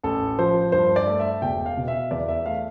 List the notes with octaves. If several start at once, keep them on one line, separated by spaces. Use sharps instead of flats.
A1 A4
F3 C5
G2 C5
D5
A3
E5
E1 G5
F5
B2
E5
E2 D5
E5
A3 F5